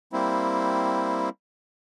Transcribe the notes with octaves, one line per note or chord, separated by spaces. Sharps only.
G3 A#3 C4 E4